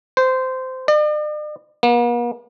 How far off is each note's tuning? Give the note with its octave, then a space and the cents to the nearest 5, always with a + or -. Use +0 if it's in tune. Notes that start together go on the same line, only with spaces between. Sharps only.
C5 -15
D5 +45
A#3 +45